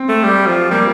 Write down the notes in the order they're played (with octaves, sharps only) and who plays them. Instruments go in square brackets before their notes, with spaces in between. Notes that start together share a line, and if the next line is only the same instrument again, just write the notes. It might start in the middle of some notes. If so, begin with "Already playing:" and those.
Already playing: [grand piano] C4
[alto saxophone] A3
G3
F3
[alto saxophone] G3 [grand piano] A#3